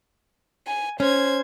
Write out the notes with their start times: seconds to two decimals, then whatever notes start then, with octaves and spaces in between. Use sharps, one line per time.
0.67 G#5
1.00 C#4 C5 G#6